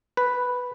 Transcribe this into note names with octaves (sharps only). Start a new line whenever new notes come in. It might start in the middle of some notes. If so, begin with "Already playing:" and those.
B4